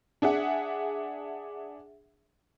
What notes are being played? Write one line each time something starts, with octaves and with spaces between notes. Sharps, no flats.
D4 G#4 E5 F#5